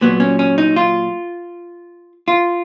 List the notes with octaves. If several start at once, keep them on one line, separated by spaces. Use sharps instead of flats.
A#2 F#3 B3
C#4
C#4
D#4
F4
F4